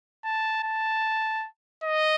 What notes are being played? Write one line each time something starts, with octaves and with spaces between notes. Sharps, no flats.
A5
A5
D#5